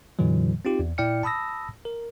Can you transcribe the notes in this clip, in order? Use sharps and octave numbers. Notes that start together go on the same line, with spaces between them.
F2 A#2 D3 E3 F#3
C4 D#4 F4 G4
E2
A#2 E4 D5 G5 F6 C#7
A5 B5 D#6 E6 A#6
A#4